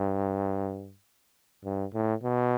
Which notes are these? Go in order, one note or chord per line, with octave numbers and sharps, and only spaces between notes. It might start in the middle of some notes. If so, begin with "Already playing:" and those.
Already playing: G2
G2
A2
B2